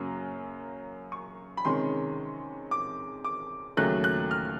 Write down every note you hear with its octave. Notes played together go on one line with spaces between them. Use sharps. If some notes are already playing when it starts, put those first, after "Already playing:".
Already playing: F#2 C#3 F#3 A#3 C#4
C#6
B5
C3 D#3 G#3 C#4 C6
D6
D6
D#2 C#3 F#3 A3 F#6
F#6
F6